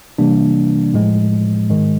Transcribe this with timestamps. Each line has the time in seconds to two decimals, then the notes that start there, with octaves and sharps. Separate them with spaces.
0.18 C3 E3 G3 A#3 D4
0.94 A2 F3 G#3
1.70 G#2 D#3 G#3